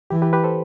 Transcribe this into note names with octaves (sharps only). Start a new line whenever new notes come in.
E3 G4
G4 B4
G4 B4
A4 C5